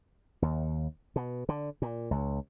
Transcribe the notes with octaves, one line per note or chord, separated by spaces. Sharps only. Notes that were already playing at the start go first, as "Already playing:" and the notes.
D#2
B2
D3
A#2
C#2